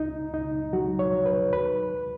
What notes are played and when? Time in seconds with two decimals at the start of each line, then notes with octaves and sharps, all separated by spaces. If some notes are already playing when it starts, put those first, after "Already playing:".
Already playing: C#2 D#4
0.33 C#2 D#4
0.73 F#3 F#4
0.99 C#5
1.12 F#3
1.26 B4
1.52 D#2 B4